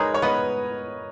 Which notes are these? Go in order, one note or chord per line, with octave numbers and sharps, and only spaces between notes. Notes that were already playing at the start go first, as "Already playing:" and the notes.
Already playing: G#3 D#4 G#4 A#4 B4 C#5
C#5
B3 B4 D#5